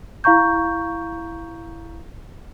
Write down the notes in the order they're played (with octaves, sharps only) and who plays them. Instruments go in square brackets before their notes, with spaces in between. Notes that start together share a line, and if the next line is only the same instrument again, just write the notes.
[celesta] E4 F5 A#5 C#6 G6